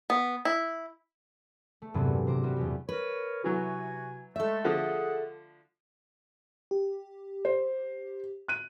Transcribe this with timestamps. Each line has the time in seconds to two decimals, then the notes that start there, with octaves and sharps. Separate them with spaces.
0.10 B3
0.45 E4
1.82 A3
1.94 E2 G2 C3 F#3 B3 C4
2.07 A#2
2.27 G#1 C5 A#5 D6
2.43 G3 B3 F#4 G4
2.56 E2 B2 G4
2.89 A#4 B4 C#5
3.44 C3 E3 F#3 F#4 G#5
4.36 G#3 A3 A4 E5
4.64 D3 F3 A3 G#4 F#5
6.71 G4
7.45 C5
8.48 F#6 D#7